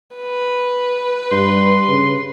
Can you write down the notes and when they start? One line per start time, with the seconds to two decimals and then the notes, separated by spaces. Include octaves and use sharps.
0.16 B4
1.32 G2 C6
1.88 C#3